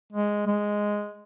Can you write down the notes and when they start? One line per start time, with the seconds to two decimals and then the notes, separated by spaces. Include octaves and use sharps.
0.13 G#3
0.47 G#3